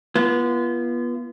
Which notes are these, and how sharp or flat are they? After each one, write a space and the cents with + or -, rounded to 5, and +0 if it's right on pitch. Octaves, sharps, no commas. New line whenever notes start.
B3 -30 F4 -35